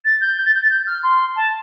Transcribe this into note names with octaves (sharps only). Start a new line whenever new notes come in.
A6
G6
G6
A6
G6
A6
G6
F6
C6
A5